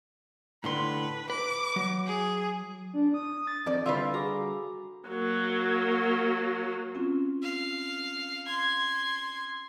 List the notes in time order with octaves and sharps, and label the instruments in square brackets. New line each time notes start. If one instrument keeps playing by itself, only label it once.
[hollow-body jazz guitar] A2 D3 C6 [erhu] B4
[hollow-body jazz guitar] B4 [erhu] D6
[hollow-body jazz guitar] F#3
[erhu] G#4
[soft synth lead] D4
D#6
A6
[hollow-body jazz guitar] F2 D#3 D5 [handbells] C4
[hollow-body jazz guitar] D3 G3 B4 [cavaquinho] F4 E5 F5
[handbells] F#4 G#4 D6 [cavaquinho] A#5
[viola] F#3 A#3
[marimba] C4 C#4 F4
[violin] F5
C6 G#6